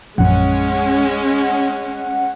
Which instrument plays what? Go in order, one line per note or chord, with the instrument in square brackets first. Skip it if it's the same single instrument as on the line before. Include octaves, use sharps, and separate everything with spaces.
[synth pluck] A#1 F#2 [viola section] G#3 C#4 [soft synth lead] F#5